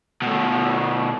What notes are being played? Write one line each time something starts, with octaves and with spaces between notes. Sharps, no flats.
B2 A3